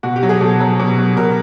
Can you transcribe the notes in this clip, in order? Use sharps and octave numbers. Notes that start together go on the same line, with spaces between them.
B2 F#4
G4
F#3
G#4
B2 A4
F#3
B2
F#3
B2 A#4